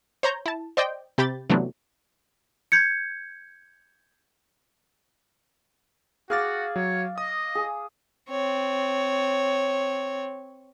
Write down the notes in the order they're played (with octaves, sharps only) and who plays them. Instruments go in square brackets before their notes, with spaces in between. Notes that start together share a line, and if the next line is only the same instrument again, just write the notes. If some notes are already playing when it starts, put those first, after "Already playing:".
[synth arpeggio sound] C5 C#5 A#5 G6
E4 A5
C5 D5 D#5 G5
C3 G4 B5 G6 A6
C3 E3 F#3 A3 B3 D4
[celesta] G6 G#6 C#7
[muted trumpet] F#4 [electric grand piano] G#4 F6 A6 [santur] F5 D6
[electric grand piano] F#3 [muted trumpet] C#5
[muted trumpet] D#5 [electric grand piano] D#6
[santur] G#4
[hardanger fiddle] C4 C#5